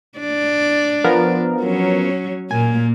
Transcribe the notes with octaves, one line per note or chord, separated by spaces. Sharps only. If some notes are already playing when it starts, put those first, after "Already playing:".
D4 D5
F3 B3 A#4
F#3 C#4
A#2 A#3 G#5